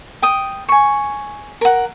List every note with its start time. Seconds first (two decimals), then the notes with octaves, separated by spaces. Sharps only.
0.22 G5 D#6
0.68 G#5 C#6
1.61 A#4 F#5